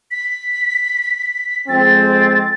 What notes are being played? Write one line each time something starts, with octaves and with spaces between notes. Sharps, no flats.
B6
F2 G#3 C4 A6